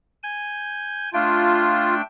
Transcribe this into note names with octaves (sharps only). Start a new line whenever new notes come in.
G#5 G6
A3 D4 F4 G5